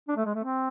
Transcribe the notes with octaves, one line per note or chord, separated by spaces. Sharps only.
D4
A3
G#3
A3
C4